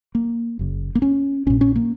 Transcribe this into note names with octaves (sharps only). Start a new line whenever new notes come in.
A#3
F#1 F#2 C#3
A#3
C#4
A#1 A#2 C#4
C#4
A#3